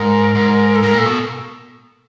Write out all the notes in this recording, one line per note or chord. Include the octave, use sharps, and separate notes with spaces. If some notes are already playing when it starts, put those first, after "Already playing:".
Already playing: G#2 A#4
G#2
A4
G#2 A#4
A#2 A4
B2